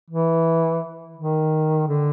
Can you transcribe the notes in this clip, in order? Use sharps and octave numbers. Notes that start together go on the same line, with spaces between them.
E3
D#3
D3